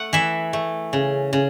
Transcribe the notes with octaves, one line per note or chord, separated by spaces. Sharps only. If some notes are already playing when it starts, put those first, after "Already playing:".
Already playing: A3 F#5
E3 E5
A3
C#3
C#3